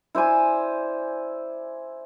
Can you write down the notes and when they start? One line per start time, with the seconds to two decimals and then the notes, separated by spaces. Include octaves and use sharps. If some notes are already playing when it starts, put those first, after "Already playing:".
0.15 E4 C5 D5 G#5